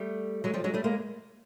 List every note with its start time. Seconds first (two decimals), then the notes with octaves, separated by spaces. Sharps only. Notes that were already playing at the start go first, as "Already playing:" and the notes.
Already playing: G3 A3
0.44 F#3 G#3
0.54 F3 G3
0.64 F#3 G#3
0.74 G3 A3
0.84 G#3 A#3